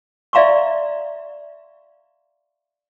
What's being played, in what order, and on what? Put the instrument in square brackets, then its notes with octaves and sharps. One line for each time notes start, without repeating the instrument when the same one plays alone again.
[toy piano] D5 E5 F5 A#5 C6 C#6